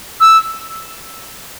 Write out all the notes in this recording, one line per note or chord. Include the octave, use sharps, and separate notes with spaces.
E6